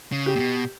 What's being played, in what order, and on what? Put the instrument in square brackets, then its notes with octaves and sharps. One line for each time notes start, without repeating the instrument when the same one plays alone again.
[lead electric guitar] C#3
[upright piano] G4
[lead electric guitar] A#2
B2